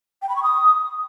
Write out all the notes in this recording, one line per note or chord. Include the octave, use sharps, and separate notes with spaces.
G5
B5
C#6
D#6